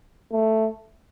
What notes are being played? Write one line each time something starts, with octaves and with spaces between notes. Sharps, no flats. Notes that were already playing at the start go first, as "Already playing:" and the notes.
A3